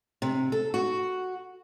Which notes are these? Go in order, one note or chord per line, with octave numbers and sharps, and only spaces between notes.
C3
A4
F#4